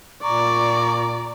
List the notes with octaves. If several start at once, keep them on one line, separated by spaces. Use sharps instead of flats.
A#2 D5 A#5 C#6